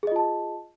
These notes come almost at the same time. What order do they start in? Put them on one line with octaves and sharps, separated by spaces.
G#4 D#5 F4 A5